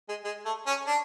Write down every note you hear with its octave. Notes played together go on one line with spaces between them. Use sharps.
G#3
G#3
A3
C#4
D4